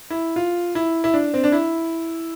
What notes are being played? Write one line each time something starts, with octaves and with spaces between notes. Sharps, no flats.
E4
F4
E4
E4
D4
C4
D4
E4